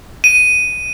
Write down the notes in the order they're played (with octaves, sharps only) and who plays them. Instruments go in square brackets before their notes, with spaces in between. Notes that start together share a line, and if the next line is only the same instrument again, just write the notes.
[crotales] D#7